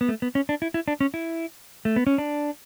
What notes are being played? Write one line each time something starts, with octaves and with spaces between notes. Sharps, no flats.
B3
A3
B3
C#4
D4
E4
E4
D4
C#4
E4
A3
B3
C#4
D4